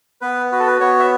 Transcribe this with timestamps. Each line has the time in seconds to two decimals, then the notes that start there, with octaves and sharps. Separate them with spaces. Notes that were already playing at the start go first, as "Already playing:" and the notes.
0.21 B3 B4
0.52 F#4 B4
0.60 A4
0.67 B4
0.80 B3 C#5
1.00 E5